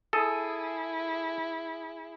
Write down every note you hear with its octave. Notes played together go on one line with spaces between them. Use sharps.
E4 G#4 A4 D#6